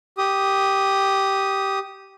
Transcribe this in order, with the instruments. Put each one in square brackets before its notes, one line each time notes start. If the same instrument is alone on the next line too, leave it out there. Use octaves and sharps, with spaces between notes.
[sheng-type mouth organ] G4 D#6